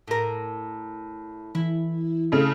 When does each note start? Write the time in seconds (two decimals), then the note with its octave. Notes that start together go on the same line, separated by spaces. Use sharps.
0.08 A2 A#4
1.55 E3 E4
2.32 C#3 A3